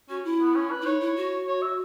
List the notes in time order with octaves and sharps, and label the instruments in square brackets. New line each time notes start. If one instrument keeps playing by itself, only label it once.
[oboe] C#4 [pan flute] F#4
[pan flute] E4
[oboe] B3
C#4
B4
[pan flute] E4
[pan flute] D#4 [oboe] C#5
[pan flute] E4
F#4
[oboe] C#5
E5